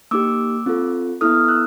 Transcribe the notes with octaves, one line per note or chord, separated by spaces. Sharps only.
A#3 D#4 G4 D6 E6
C4 F4 A4
B3 E4 A4 D#6 F6
E6 F#6